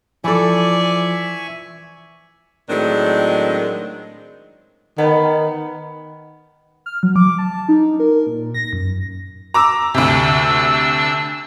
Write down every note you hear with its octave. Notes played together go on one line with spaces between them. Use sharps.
E3 F3 A4 D5 E5 G#5 C#6
A2 D#3 F#3 G#3 C4 D4
D#3 B3
F6
F#3
D6
A5
D#4
A#4
A#2
A#6
F#2
A#5 D6 E6
D2 C3 D4 E6